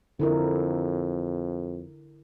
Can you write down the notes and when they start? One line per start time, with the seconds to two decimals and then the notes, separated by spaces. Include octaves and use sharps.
0.20 F2 D3 E4 A#4